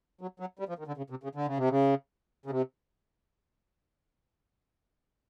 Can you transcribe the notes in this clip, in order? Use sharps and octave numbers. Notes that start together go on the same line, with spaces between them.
F#3
F#3
G3
F3
D#3
D3
C#3
C3
C#3
D3
C#3
C3
C#3
C#3
C3